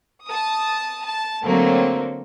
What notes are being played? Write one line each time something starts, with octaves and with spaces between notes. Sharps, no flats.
A5 D#6
A5
D3 F#3 A3 A#3 C4